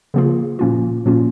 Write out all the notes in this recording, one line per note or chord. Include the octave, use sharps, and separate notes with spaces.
C#3 F3 A#3 F4 G#4
A#2 F3 A#3 C#4 F4
A#2 F3 A#3 C#4 F4